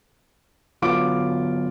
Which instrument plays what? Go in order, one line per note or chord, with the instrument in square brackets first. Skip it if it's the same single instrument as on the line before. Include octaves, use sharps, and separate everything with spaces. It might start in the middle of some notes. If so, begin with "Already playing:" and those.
[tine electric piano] D3 F#3 B3 [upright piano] F4 D6 D7